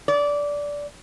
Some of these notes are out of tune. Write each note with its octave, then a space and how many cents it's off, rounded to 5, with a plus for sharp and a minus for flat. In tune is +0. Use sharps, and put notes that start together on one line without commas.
D5 -15